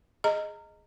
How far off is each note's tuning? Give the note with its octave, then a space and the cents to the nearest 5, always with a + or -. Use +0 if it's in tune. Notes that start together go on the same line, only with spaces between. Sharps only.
G#4 +0 D#5 +0 A#5 -25